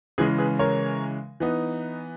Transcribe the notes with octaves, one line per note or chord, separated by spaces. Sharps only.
C#3 E3 G#3 G#4 B4
G#4 B4
A#4 C#5
E3 B3 D#4